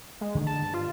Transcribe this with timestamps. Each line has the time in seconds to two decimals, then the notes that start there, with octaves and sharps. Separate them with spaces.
0.21 G#3
0.35 D3 D#3 A3
0.47 A5
0.62 G2
0.74 F4